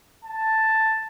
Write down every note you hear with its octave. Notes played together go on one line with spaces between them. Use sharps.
A5